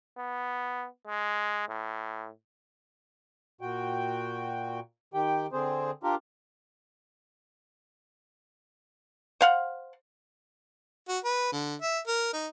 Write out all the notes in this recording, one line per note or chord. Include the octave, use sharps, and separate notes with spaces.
B3
G#3
A2
A#2 F#4 G5
D#3 G4 G5
D3 C4 G#4 C5
D4 F4 G4 A#4
C5 F5 F#5
F#4
B4
D3
E5
A#4
D#4